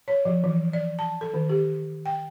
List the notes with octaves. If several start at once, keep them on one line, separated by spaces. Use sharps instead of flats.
C#5
F3
E3
D5
A5
A4
D#3
G4
G5